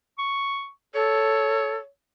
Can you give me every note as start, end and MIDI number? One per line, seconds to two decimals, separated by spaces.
0.19 0.70 85
0.95 1.76 69
0.95 1.88 73